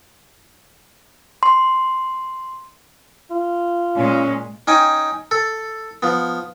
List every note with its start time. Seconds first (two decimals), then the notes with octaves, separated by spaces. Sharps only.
1.43 C6
3.31 F4
3.96 A#2 G#3 C#4
4.67 C#4 D#4 G5 G#5
5.31 A4
6.02 F3 B3